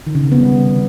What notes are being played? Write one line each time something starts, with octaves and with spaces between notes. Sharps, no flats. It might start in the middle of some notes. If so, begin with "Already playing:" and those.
D#3
C#3
C3
B3
G3